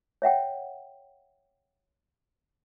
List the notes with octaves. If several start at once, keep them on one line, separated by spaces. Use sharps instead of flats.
C#5 E5 F#5 G5